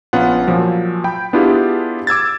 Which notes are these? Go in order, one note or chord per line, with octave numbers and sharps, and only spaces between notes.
A#1 B3 C#4 F4 F#5
A#2 F3 F#3
G5 B5
B3 D4 E4 F4 G4 G#4
D6 E6 G#6 A6